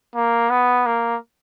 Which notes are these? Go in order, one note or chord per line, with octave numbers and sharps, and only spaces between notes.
A#3
B3
A#3